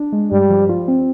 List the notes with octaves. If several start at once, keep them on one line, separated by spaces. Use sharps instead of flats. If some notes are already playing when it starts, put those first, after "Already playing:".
Already playing: D4
G#3
G2 G3
F3
F4
C4